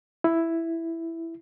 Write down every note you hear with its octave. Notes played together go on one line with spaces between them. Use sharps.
E4